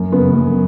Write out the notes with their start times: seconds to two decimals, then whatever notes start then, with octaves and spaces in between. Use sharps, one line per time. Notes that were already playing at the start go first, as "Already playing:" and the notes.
Already playing: F#2
0.12 C#3 B3
0.33 F#2